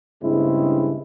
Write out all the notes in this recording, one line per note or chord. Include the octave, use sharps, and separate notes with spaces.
A#1 G2 C#3 G#3 C4 E4